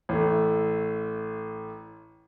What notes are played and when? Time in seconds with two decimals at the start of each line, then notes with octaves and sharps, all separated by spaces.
0.09 A1 A3